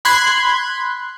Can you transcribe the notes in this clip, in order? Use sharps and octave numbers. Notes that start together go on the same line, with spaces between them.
B5 C6 F#6 G#6